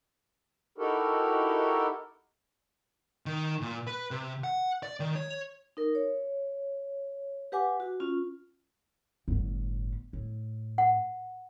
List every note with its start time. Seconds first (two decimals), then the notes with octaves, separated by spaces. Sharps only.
0.78 D#4 E4 F#4 G4 A4 A#4
3.26 D#3
3.61 A#2
3.87 B4
4.11 C3
4.44 F#5
4.83 D5
5.00 D#3
5.15 C#5
5.77 D#4 A#4
5.95 C#5
7.52 G4 B4 F#5 G#5 D6
7.80 F#4
8.00 C#4 F4
9.28 G1 A2
10.13 A2
10.78 F#5